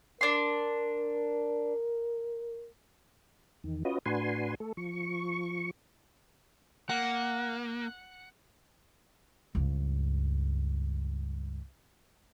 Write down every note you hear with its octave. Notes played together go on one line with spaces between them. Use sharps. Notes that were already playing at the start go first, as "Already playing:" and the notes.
D4 A#4 C6
E2 D#3
C#4 F4 F#4 B4 D#5
A2 D4 F#4 B4 G#5 C6
A3 A4
F3 C#6
A#3 F#5
C#2 G2